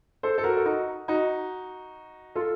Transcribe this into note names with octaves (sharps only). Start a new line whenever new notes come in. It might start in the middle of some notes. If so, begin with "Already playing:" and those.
A4 C5
A4
F#4 A#4
A4
D#4 F#4
D#4 F#4
F4 A4